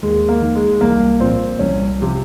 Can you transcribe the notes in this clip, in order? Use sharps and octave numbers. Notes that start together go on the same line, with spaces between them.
D#2 G#3
A#3
D#3
G#3
C2 A#3
A#2 F3 C4
C2 C#4
C3 F3